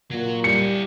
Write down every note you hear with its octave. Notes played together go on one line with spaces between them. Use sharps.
A#2 F#3
G3 E4 D5 C#7